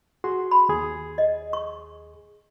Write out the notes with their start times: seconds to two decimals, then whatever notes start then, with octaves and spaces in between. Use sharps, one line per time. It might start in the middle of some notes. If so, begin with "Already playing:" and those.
0.24 F#4 G#4 C6
0.51 B5
0.69 D#2 G#4
1.18 D#5
1.53 C#6